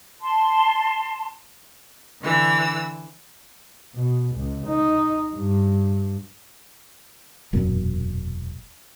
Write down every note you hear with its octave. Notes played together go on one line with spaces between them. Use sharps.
A5 C6
D3 E3 E6
B2
C#2
D#4
G2
E1 F#2 A#2